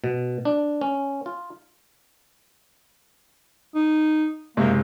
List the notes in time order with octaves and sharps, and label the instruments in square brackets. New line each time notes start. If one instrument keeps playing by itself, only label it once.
[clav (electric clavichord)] B2
D4
C#4
F4
[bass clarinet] D#4
[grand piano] F#1 C3 G#3 [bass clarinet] A#3